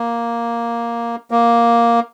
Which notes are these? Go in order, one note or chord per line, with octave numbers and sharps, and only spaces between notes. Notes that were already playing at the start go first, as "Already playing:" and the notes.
Already playing: A#3
A#3